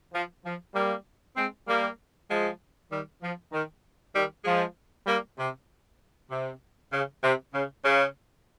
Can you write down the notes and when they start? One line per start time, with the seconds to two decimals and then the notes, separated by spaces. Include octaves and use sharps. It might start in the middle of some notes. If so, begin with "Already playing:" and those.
0.13 F3
0.45 F3
0.74 G3 A#3
1.36 G#3 C4
1.68 G3 A#3
2.29 F3 G#3
2.91 D#3 G3
3.22 F3
3.52 D#3
4.14 D#3 G3
4.45 F3 G#3
5.07 G3 A#3
5.38 C3
6.31 C3
6.92 C#3
7.23 C3
7.53 C#3
7.84 C#3